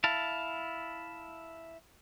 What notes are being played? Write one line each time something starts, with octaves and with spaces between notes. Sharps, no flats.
E4 F5 A5